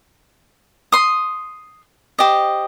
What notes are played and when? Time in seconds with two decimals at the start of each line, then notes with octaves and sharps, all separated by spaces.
0.92 C6 D#6
2.19 G4 C5 D#5